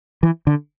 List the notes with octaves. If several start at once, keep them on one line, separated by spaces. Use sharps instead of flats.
E3
D3